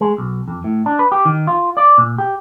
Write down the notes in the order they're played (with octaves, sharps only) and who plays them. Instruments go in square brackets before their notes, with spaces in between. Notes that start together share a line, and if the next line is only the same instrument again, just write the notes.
[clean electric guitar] G#3
B1
F2
A2
D4
B4
G4
D#3
F4
D5
A#2
G4